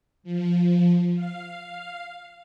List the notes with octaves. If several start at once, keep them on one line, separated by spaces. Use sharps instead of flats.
F3
F5